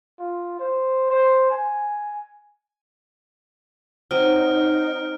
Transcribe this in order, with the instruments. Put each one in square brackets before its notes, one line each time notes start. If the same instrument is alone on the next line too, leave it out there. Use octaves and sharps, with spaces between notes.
[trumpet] F4
C5
C5
G#5
[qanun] F#3 C4 D#5 [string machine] D#4 [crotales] F6 D7